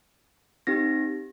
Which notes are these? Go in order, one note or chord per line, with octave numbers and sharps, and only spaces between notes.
C4 D#4 G4 A#6